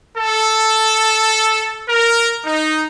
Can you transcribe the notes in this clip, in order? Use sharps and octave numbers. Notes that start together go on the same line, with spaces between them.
A4
A#4
D#4